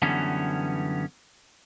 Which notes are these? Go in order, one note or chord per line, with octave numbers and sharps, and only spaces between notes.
F#2 D3 E3 G3 B3 C#4